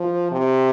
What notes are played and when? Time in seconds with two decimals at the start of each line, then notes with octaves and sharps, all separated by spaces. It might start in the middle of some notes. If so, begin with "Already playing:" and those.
Already playing: F3
0.32 C3